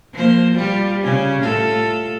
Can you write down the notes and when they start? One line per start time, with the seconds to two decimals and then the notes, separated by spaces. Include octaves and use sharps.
0.13 F3 A#3 C5
0.55 G3 F4 G4
1.02 C#3 C#4
1.40 A2 F4 A4